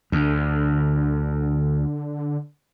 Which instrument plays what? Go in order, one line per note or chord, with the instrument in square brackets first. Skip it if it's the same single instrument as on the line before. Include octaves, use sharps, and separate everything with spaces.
[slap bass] D2 [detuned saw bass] D3